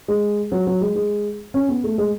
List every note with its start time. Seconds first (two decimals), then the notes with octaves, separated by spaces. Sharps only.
0.08 G#3
0.52 F#3
0.67 F#3
0.81 G#3
0.95 G#3
1.54 C#4
1.69 B3
1.84 A3
1.98 G#3